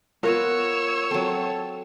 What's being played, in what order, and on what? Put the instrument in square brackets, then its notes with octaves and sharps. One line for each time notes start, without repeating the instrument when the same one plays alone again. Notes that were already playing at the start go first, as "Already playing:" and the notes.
[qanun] B3 F4 B4 [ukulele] A#4 [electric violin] C#5 E6
[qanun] F#3 C4 [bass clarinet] A4